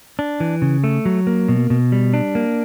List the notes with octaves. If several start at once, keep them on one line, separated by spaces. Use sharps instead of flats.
D4
E3
C#3
A3
F#3
A#3
B2
B2
G3
D4
A#3